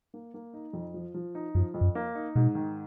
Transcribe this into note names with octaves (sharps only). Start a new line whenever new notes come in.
A#3
A#3
D#4
F2
F3
F3
D#4
F#2 F3
F2
F#2
A#3
D#4
G#2 B2
D#3